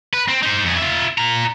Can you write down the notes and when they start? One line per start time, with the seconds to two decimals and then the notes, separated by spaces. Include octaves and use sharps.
0.14 B4
0.28 C4
0.43 D#4 C5
0.65 F2 G#4
0.78 F4 E5
1.18 F4 A#5